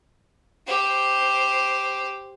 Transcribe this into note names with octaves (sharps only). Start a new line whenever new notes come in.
G4 C5